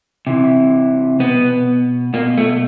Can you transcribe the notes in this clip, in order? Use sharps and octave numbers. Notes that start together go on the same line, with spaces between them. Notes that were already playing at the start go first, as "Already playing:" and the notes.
C3 E3
B2 B3
B2 A#3
A3